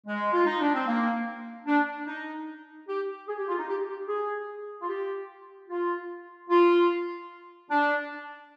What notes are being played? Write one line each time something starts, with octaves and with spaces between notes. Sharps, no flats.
G#3
F4
D#4
D4
C4
A#3
D4
D#4
G4
G#4
G4
F4
D#4
G4
G4
G#4
F4
G4
F4
F4
D4